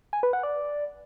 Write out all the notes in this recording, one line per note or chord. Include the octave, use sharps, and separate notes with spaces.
G#5
B4
F#5
D5